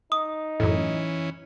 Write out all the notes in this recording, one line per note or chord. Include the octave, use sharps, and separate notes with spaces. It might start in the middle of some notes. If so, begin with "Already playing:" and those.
D#4 D#6
F#2 A2 E3 C#4